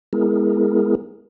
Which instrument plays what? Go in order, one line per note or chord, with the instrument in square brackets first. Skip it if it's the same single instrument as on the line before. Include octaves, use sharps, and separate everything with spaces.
[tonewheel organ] G#3 B3 E4 G#4 A#4